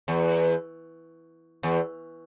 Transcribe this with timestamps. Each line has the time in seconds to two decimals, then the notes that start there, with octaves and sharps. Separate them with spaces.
0.08 E2
1.63 E2